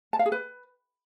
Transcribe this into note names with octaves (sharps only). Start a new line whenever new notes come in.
A5
F5
G#4
B4